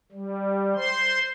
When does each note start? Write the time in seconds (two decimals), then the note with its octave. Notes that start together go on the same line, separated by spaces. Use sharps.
0.12 G3
0.75 C5 C6